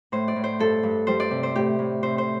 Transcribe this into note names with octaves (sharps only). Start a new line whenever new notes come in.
A2 C5
D5
A2
C5
G2 A4
G2
G3 C5
D5
C3
C5
A2 G4
A2
C3 C5
C5